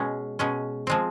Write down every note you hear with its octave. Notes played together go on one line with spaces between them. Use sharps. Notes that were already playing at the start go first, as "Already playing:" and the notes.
Already playing: B2 G#3 C#4
B2 G#3 C#4
F3 G#3 C4